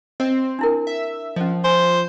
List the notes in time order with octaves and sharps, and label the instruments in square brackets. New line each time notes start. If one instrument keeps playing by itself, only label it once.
[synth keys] C4 [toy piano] D#5
[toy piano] D4 E4 A#4
[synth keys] E5
[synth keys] F3 [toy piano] C#4 D#5
[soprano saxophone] C5 [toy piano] G#5